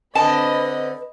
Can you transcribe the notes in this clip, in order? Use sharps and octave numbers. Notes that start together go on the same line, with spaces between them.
D3 C4 B4 D#5 A5 B5